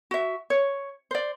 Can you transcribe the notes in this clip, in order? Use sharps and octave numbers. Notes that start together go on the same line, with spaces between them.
F#4 E5
C#5
C5 D5